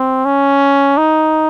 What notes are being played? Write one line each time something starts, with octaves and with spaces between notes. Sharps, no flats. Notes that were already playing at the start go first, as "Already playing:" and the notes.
Already playing: C4
C#4
D#4